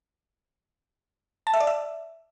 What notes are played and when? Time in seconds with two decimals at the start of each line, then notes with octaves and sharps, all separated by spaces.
1.47 A5
1.54 E5
1.60 D5
1.67 E5